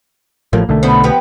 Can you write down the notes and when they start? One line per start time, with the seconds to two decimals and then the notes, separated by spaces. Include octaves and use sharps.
0.53 A1 A2 F3 A#3
0.69 B1 D3 A3
0.83 B2 B3 C5
1.04 F3 B3 G4